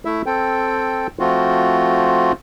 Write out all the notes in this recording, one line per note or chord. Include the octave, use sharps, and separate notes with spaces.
A3 E4 E5
C4 A4 G5
F3 A3 C4 F4 F#4